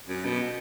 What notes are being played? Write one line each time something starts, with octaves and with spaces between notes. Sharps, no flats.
F#2
B2